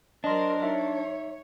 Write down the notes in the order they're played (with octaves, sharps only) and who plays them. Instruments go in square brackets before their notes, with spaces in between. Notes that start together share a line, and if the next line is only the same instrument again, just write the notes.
[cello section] F#3 A#4 C5 [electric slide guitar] D4 [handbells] D#5 C6
[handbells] D#4 E5 [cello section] C#5